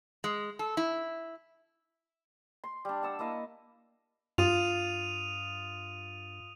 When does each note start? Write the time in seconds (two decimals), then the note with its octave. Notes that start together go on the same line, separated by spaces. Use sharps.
0.24 G#3
0.59 A4
0.77 E4
2.64 C6
2.85 G3 D4
3.03 F#5 A5 E6
3.19 A#3 E4 D#5 F5
4.38 G2 F4 D#6 D#7 F7